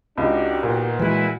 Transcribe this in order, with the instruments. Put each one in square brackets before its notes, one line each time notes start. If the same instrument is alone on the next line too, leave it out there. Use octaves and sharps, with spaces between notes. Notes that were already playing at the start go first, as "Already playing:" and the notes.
[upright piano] C#2 [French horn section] D4 [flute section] D#4 F#4 G4
[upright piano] A#2 [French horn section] D#3 B3 C5
[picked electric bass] E3 G#3 [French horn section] E4 F#4 [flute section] B4 G#5